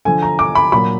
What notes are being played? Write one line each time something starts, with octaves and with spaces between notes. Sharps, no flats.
D3 F3 G#5
A#5
D6
B5
A#2 F#3 B5